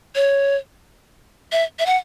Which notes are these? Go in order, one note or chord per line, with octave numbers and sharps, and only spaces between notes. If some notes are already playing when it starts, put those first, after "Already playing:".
C#5
E5
E5
F#5